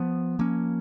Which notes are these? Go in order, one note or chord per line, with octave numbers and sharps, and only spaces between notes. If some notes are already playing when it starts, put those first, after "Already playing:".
Already playing: F3 B3
F3 A#3 C#4